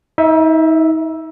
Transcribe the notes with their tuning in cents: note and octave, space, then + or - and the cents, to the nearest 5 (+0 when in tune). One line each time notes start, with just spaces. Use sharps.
D#4 +40 E5 +0